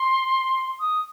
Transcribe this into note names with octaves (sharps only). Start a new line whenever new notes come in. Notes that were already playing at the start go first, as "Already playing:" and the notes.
Already playing: C6
D#6